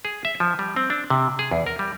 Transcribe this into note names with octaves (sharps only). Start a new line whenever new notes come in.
G#4
E5
F3
G3
C4
D4
C3
G#4
E2
A#4
G3